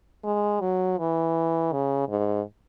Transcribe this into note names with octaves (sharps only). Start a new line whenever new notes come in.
G#3
F#3
E3
C#3
G#2